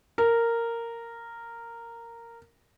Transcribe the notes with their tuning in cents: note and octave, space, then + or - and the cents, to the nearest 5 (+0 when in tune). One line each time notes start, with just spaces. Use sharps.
A#4 -10